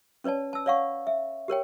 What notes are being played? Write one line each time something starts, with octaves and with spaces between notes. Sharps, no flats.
C#4 B4 C#5 D5 A5
A5 E6
C#5 D5 F5 F#5 C#6
E5
G4 A#4 C#5 G5